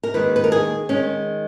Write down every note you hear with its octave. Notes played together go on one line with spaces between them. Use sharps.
A#4
D#2 D#3 G#3 B4
B4
A#4
G#4
D#3 G#3 C#4